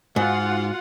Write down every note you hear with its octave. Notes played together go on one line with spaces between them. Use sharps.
G#2 F4 F#4 F#5